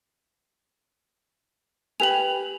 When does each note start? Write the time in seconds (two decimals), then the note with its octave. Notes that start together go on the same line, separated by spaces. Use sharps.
2.00 G4 B4 G#5 F7 F#7